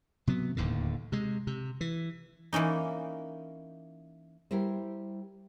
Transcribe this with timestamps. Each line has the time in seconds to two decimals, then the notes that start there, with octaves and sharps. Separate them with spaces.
0.27 C3 F#3 B3
0.57 D1 D#2 A2 D3
1.12 C3 G#3
1.47 C3
1.81 E3
2.53 E3 A#3 C#4 D#4
4.51 G3 E4 A#4 C5